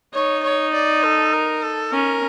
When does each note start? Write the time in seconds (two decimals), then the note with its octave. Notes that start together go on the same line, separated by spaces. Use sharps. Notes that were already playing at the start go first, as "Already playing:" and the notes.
0.14 D#4 C#5
0.43 C#5
0.74 D5
1.03 A4
1.33 A#4
1.62 A4
1.92 C#4 A#4